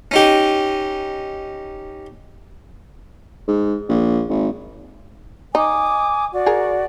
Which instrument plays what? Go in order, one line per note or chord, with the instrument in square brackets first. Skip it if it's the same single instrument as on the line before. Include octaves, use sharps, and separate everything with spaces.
[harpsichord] C#4 D#4 G4
[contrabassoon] G#2
A#1
G#1
[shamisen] D#4 [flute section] G#5 D6 D#6
[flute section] F#4 D5
[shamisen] G#4 A#4